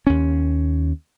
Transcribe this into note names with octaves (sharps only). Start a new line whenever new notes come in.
D#2 C#4